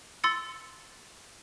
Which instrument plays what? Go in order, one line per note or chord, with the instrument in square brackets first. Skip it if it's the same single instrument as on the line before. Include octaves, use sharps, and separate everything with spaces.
[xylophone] C6 E6 A6 C#7